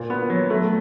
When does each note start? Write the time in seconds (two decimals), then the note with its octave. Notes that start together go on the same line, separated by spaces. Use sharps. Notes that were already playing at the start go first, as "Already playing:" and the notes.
Already playing: A#2
0.10 B3
0.30 F#3
0.50 A3